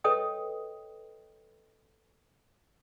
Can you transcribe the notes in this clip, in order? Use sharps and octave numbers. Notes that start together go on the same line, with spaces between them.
A4 B4 C#5 D#5 G5 D#6